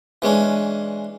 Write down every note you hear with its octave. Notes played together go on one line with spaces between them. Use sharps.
E3 G#3 C#4 D4